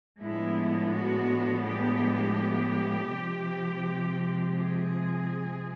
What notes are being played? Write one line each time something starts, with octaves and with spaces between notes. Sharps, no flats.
A2 F3 G#3 B3 D4 E4
F#4
G4
C3 F3 G#3 C4
G#4